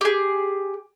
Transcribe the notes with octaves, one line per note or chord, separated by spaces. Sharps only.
G4 G#4